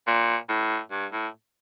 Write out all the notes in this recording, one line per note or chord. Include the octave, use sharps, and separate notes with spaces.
A#2
A2
G2
A2